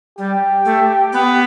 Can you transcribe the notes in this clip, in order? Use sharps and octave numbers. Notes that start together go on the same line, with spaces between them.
G3 G4
A3
B3